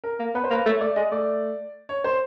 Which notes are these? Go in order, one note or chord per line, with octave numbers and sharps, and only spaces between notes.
A#4
A#3
B3 B4
C5
A#3 B4
A3 C#5
A3 D5
G#3 D#5
A3 D5
C#5
C5